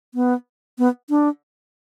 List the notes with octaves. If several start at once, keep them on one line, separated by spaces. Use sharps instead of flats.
B3
B3
D4